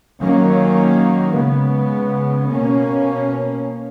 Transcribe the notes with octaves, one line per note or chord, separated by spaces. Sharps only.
D#3 F#3 A#3 C#4
C#3 G#3 B3
B2 A#3 C#4